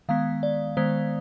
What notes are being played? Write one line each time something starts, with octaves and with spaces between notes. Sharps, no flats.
D#3 G#3 B3 F5
D5
D#3 G#3 B3 C5